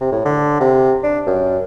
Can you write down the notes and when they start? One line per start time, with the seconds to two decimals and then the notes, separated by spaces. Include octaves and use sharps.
0.01 C3
0.12 A2
0.25 D3
0.60 C3
1.03 D4
1.26 F#2